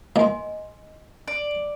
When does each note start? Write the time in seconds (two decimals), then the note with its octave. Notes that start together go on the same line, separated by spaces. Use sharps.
0.16 E2 A#3 D#5 G#5 C6
1.28 D5